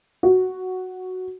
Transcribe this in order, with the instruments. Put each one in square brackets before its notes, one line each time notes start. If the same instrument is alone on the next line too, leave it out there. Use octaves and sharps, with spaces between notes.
[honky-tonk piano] F#4